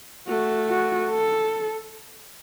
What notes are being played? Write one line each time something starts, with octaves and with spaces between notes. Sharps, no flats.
A3 F#4
F#4
A4